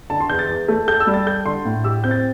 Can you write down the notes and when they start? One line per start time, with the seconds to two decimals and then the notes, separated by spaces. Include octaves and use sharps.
0.10 D3 A5
0.20 C6
0.30 E2 G6
0.39 A6
0.49 E2
0.68 A3
0.88 A4 G6
1.00 E6
1.07 G3
1.14 A6
1.26 A4 G6
1.46 D3 C6
1.65 A2
1.84 G4 E6
2.04 C4 G6
2.11 A6